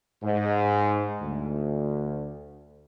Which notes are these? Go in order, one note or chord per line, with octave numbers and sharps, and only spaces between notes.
G#2
D2